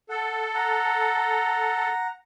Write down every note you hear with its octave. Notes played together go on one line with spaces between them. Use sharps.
A4 F#5
F#5 A#5